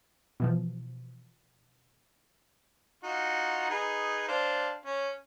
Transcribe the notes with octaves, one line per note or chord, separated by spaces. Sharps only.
B2 E3 F3
D#4 F4 F#4
D#4 G#4 B4
D4 C5 F5
C#4